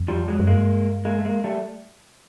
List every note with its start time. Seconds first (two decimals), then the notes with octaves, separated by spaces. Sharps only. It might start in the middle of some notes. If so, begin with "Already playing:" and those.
Already playing: F2
0.08 F3 G3
0.28 F#3 G#3
0.40 F#2
0.47 G2 G#3 A#3
1.05 G#3 A#3
1.19 A3
1.25 G#3 A#3
1.44 G3 A3